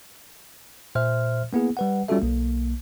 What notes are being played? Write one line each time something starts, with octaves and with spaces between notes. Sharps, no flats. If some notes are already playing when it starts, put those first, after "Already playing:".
A#2 C5 E5 F6
A#3 B3 E4 G#4
G3 B4 F#5
G3 C#4 F4 F#4 A4 E5
B1 A#3